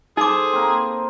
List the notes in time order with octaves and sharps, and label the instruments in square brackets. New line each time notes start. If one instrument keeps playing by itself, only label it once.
[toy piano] D#4 D6 [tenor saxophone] G#4 [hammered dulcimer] A4 C5
[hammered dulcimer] A#3 C4